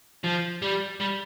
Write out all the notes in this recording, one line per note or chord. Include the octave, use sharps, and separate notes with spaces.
F3
G3
G3